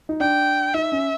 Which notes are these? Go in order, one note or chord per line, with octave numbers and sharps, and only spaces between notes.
D#4
D4 G5
D#4 E5
C#4